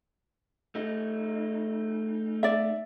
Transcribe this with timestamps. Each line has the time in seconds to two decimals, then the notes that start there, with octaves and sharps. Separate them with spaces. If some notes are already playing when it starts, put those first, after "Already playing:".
0.75 A3 D#4
2.43 D5 E5